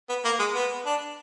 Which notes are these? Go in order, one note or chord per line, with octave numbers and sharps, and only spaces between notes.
B3
A#3
G#3
B3
D4